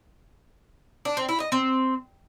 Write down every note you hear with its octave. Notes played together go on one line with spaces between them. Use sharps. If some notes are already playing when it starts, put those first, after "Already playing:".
D4
C4
E4
D#5
C4